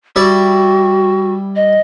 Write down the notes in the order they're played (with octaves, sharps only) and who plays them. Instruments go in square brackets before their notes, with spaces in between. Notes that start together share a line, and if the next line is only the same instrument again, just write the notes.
[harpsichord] G3 E4 D5 [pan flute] F#4
[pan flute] D#5